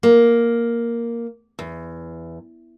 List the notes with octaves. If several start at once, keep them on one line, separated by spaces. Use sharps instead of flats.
A#3
E2